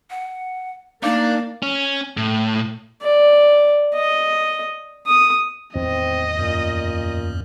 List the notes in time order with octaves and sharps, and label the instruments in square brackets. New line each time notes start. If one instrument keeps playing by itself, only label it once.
[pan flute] F#5
[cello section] A#3 [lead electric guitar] D4 [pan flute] D#4 [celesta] F5 D6
[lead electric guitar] C#4
A2
[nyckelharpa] D5
D#5
D#6
[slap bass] E2 A2 D#3 [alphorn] C4 [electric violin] D#5
[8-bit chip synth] F#2 [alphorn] A#2